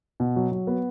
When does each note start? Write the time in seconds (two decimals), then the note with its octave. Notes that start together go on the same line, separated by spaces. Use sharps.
0.20 B2
0.36 F#3
0.52 F#3
0.67 B3